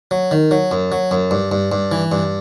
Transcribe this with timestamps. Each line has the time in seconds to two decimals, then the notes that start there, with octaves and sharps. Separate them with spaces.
0.11 F#3
0.31 D#3
0.51 F#3
0.71 F#2
0.92 F#3
1.11 F#2
1.31 G2
1.52 G2
1.72 G2
1.92 E3
2.12 G2